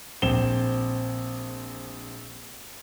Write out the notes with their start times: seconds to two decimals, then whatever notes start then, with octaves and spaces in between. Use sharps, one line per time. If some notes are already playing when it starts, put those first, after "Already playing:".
0.22 A#1 C4 E7 G7